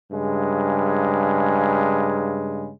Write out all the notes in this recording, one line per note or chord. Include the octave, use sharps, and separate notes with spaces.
G2 C#3 G#3